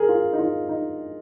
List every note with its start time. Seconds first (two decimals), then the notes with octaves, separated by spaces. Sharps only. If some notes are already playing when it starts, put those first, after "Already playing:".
Already playing: G#4 A#4
0.09 F4
0.33 D#4
0.39 F4
0.69 D#4